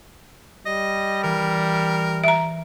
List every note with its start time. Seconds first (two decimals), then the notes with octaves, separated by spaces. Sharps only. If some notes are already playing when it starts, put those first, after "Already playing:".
0.66 G3 D#5
1.23 E3 A#4
2.24 E5 A#5